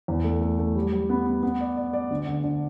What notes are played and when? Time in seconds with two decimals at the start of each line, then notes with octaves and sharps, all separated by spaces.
0.08 E2
0.24 A3
0.41 A3
0.59 A3
0.75 G3
0.92 G3
1.09 B3
1.26 B3
1.43 B3
1.60 D5
1.77 D5
1.93 D5
2.10 D2
2.27 D3
2.44 D3